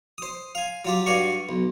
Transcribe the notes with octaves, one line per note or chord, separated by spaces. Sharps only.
C5 D#6
F5 G#5
F#3 F4 G4
G2 F#4 D5 F5 G#5 C#6
B1